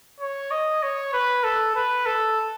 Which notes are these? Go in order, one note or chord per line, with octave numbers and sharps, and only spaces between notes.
C#5
D#5
C#5
B4
A4
B4
A4